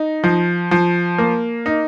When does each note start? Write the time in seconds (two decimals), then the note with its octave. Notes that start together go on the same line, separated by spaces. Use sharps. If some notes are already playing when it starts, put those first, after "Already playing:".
Already playing: D#4
0.24 F3
0.71 F3
1.18 A#3
1.66 D#4